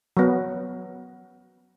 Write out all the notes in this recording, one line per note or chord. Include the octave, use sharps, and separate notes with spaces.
F#3 B3